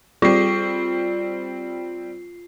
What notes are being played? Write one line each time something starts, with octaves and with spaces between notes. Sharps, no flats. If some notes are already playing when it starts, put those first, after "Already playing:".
G3 C4 F4 C7